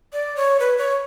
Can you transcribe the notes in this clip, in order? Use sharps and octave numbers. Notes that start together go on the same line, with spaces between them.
D5
C#5
B4
C#5